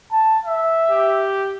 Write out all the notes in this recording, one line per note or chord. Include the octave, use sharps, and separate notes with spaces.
A5
E5
G4